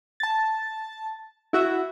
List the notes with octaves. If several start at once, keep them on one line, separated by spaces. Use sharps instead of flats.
A5 A6
E4 F#4 E5